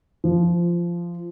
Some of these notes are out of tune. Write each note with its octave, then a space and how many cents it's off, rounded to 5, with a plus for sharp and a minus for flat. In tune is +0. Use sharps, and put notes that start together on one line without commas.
F3 -15